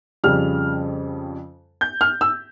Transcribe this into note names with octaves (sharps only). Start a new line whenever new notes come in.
F2 C#3 G3 F6
G6
F6
E6